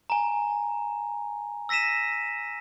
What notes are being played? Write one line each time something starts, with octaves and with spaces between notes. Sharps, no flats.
G#5 A#5
E6 A#6 B6 D#7 E7